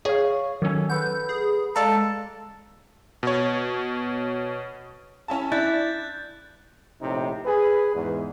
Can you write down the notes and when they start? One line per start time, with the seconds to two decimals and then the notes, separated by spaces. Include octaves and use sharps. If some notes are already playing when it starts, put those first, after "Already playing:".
0.05 G#4 C#5 F5
0.62 D#3 F#3 C#4 A4 G#5
0.90 A4 B4 F#5 G6
1.29 G#4
1.76 G#3 A4 D5 F5 A#5
3.23 B2 C#5
5.28 C#4 E4 A5
5.52 D4 E4 F#6 G6 A6
7.01 A#1 A2 C3 D#4
7.45 G#4 B4
7.94 E2 G#2